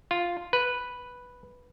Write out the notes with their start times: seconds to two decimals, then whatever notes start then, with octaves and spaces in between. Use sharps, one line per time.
0.11 F4
0.53 B4